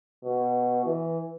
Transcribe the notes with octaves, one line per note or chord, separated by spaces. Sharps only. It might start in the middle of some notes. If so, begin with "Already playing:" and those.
B2
E3